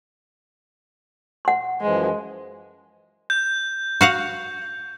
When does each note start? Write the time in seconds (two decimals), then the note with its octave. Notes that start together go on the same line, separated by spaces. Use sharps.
1.45 F#5 C6
1.82 F#2 E3 F3 G#3
3.30 G6
4.01 F#4 F5 F#5